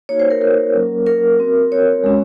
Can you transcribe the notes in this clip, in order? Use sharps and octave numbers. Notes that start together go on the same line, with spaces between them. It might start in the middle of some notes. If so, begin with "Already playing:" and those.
A#3 D#4 F#4 C#5
C5
A#4
A#4
F#3 A#3 C#4
A#4
C4 F#4
C#5
G#3 C#4 F#4